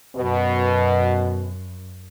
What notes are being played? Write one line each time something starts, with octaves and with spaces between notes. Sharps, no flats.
F#2 B2